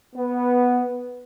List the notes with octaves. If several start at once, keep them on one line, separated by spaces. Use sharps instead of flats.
B3